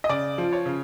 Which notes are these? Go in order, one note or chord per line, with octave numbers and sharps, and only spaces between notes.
D#5
C#3 D5
F3
C#5
C#3